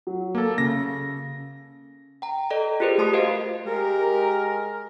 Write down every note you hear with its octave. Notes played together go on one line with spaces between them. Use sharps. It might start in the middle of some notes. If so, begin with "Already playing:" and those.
F#3
A#3 A4
C#3 A#6
G5 A#5
A4 D5 D#5 A#5
F4 G4 G#4 A#4 C5
A3 G4 A5 C6 D#6
F#4 C5 D#5 F5
G#3 G4 A#4